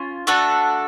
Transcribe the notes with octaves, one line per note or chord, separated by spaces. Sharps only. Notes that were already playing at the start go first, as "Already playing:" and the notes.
Already playing: C#4 F4
A3 D4 F#4 A4